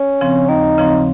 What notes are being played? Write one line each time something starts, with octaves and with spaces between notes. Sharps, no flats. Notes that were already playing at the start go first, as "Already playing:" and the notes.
Already playing: C#4
C#3 F3 C4
D#2 D#4
C#3 F3 C4